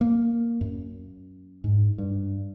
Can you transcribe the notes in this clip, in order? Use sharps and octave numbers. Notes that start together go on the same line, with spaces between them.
A#3
F#2
G#2
G2